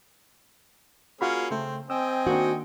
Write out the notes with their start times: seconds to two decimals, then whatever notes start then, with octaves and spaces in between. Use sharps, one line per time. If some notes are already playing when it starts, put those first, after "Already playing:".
1.21 A#3 C#4 F4 F#4 G#4 B5
1.51 C#3 A3 C4
1.90 C4 D#5 G5 G#5 E6
2.27 D#3 A#3 D4 F#4